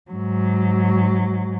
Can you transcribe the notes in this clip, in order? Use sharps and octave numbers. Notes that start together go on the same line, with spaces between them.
G#2 F#3